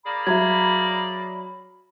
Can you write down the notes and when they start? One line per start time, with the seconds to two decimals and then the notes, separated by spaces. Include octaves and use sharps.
0.05 A#3 G#4 D5 B5
0.27 F#3 E5 A#5 G#6